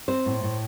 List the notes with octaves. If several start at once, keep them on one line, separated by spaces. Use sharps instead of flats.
C4 C5
A2
A2